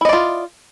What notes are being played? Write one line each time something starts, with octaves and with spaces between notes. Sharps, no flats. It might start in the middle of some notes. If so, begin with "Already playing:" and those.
E4 F4 D5 D#5